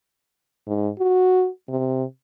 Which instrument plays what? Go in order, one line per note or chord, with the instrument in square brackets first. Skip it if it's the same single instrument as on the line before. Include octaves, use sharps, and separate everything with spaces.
[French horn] G#2
F#4
C3